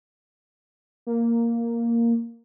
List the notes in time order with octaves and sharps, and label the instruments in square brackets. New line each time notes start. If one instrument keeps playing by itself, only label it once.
[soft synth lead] A#3